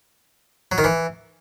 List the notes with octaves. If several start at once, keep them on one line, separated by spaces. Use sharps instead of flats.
F#3
D#3
E3